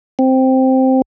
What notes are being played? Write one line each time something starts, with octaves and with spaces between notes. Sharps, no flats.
C4